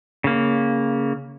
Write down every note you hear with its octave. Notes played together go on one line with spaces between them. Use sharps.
C#3 A#3